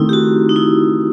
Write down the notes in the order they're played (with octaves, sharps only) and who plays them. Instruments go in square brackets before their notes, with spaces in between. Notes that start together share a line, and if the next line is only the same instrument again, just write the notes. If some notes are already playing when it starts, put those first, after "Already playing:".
Already playing: [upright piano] D#3 A3 [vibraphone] C4 D#4 E4
[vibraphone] G4
F#4
D#4
E4